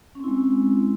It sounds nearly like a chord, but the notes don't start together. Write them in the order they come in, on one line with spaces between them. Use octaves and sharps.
C#4 C4 E4 G#3